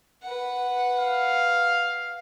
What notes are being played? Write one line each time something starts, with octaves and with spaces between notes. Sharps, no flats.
B4 F#5
F5